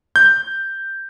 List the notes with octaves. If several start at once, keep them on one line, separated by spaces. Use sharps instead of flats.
G6